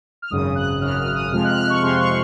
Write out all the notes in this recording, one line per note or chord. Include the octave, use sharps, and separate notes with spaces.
F6
G#1 F#2 C#3 D#6
F#6
G#1 F#2 C#3 F6
F6
D#6
F2 C3 F3 G#3 F6
F#6
F6
C#6
F2 C3 F3 G#3 C6
C#6